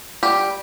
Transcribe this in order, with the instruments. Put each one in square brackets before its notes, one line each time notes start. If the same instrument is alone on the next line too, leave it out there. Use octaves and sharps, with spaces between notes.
[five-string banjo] G3 G4